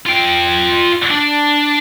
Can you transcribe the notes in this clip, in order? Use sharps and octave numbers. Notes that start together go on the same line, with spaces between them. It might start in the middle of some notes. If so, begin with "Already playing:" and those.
F4 G5
D4